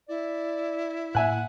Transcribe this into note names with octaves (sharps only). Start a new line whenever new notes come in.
E4 D5
A2 A#3 E5 F#5 G#5 F#6